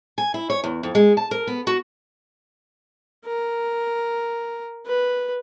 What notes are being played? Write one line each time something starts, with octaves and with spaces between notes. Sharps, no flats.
G#5
E4
C#5
E2
F2
G#3
A5
A#4
B3
F#4
A#4
B4